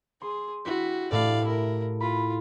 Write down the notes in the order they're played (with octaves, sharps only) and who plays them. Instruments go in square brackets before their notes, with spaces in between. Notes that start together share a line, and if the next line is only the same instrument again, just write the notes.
[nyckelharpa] G#4 [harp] C6
[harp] E4 G4 B6 [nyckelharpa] F#4
[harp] A2 [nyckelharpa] D5 F5
[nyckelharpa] E4 A#4
[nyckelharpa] F4 [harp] B5